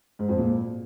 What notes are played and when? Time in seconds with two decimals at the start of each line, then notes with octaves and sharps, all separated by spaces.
0.19 G#2
0.29 F2
0.38 A#2